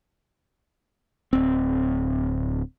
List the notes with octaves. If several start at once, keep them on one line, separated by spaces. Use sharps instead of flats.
D1 C4